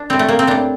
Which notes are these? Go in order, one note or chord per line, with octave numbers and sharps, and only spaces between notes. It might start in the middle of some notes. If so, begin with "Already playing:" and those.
Already playing: D4
A2 G3 C4
A3
A#3
C4
A2 G3 D4